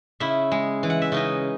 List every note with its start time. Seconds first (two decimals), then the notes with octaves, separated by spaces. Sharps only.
0.20 C#3 E4 E5
0.52 G#3
0.83 E3
0.90 F#5
1.02 E5
1.12 C#3 D#4 D#5